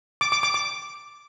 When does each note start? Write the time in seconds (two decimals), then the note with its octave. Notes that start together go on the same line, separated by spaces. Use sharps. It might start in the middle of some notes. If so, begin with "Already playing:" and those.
0.21 D6
0.32 D6
0.43 D6
0.54 D6